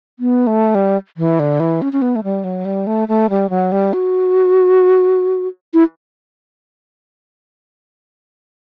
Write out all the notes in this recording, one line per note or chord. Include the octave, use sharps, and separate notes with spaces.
B3
A3
G3
E3
D3
E3
C#4
C#4
B3
A3
G3
F#3
G3
A3
A3
G3
F#3
G3
F#4
E4